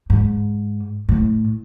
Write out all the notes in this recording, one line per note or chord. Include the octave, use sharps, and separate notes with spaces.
G#2
A2